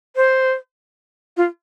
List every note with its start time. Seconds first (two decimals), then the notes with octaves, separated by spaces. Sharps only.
0.16 C5
1.37 F4